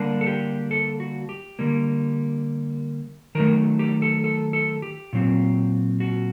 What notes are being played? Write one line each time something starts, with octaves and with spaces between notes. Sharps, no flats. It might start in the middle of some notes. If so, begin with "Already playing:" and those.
Already playing: D3 G3 A#3 D4
A4
G4
A4
F#4
G4
D3 G3 A#3
D#3 F#3 A3 A#4
G4
A4
A4
A4
G4
A#2 F#3 C4
F#4